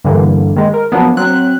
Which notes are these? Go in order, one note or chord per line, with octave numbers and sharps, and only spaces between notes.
G2 D3 E3 A#3
D#3 G#3
A#4
F3 F#3 A#3 B3 D4
F#3 C4 F#6